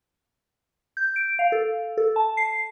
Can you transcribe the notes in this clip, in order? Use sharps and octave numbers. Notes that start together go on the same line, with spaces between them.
G6
D7
F5
A4
A4
A5
C7